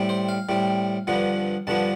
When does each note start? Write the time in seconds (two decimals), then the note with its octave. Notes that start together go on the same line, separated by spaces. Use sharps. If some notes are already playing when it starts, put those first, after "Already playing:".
Already playing: A2 G3 C4
0.09 C5
0.29 F5
0.49 A2 G3 C4
1.07 G2 D3 F3 B3
1.67 G2 D3 F3 B3 A5